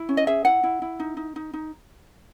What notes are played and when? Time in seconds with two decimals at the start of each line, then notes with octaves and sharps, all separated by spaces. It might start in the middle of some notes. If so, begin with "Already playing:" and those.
Already playing: E4
0.09 C#4
0.17 D#5
0.27 G#4 E5
0.45 E4 F#5
0.63 E4
0.82 E4
1.00 D#4
1.17 D#4
1.36 D#4
1.53 D#4